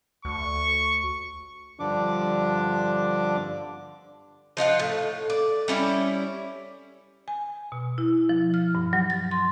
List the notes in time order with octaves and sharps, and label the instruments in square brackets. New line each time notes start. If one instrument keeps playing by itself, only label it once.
[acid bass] D2 [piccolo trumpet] C#6
[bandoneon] G2 D3 F3 D4 D6
[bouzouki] F3 D#4 F4 F#5
A2
D5
G3 C#4 E4 D5
[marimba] G#5
B2
E4
F3
F6
G2
F#3
A6
C6